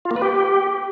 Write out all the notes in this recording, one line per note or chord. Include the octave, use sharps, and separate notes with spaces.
F4
A#3
B4
G4